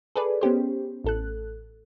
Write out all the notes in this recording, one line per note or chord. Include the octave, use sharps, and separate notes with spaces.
G#4 A4 B4 D5
B3 C#4 G4 C5
A1 A4 F#6